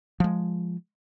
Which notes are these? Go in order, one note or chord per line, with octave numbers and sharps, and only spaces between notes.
F3 G#3